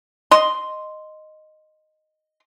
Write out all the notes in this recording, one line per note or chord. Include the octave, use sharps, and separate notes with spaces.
D#5 C6